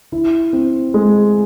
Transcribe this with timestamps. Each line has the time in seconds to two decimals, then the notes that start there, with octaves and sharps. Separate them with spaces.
0.12 E4
0.53 C4
0.94 G#3